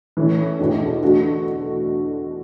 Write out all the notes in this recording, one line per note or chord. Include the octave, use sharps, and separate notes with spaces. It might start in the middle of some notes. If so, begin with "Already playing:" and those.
E3 A3 C#4
E2 B2 A3 D4
D3 A3 D4 F#4